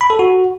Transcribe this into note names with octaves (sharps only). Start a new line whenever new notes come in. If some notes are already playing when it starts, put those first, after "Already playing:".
B5
A4
F#4